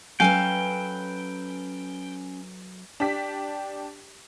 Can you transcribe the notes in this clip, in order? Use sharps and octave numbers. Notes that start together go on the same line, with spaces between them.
F#3 C#4 A4 B4 F5 G5 G#5
D4 G4 B6